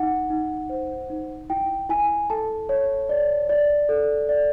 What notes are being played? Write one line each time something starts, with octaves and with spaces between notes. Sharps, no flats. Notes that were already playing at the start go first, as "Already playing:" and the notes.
Already playing: D#4 F#5
D#4
C5
D#4
E4 G5
E4 G#5
A4 A5
C#5
D5
D5
A4
D5